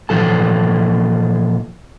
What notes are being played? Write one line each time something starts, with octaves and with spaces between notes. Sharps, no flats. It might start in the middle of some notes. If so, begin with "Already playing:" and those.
A#2 E3 F3 A4 A5